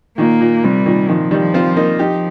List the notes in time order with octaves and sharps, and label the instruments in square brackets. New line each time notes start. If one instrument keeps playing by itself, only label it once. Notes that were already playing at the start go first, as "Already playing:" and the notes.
[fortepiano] A#2 D#3 [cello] A#3
[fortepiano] A#2
[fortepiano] C3 [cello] G3
[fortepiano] A#2 D#3
[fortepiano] A#2 D#3 [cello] F3
[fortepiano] D#3 G3
[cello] F3
[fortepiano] C4 F4
A#3 D#4
[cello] F3 [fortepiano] D#4 G4